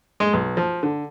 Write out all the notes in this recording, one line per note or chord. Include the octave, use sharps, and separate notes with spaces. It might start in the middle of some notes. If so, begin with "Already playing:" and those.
G#3
B1
F3
D3